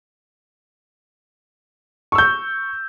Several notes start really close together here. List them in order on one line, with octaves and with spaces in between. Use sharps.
C#6 E6 G6